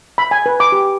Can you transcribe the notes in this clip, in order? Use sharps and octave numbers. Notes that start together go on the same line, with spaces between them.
B5
G#5
B4
D6
G4